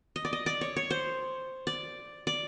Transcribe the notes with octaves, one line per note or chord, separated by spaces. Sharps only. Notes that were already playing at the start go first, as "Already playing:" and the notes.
D#5
D5
D#5
D5
C#5
C#5
C5
D5
D5